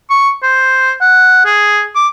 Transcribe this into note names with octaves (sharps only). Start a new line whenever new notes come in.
C#6
C5
F#5
G#4
D6